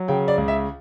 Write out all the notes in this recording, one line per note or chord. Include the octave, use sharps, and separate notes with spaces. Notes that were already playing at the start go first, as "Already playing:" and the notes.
Already playing: F#3
C#3 G5
D5
C#2
E5